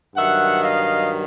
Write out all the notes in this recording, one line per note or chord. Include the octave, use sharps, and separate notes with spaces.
G2 D#3 F#3 E5 F#5
D#5 F5